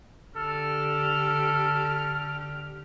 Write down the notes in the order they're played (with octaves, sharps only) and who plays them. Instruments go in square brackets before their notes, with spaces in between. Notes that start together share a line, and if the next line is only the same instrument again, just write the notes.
[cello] D3 G4 [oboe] A4 [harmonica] F6